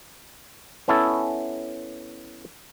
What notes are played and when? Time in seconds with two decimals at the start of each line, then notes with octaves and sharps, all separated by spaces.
0.88 B3 C#4 E4 A4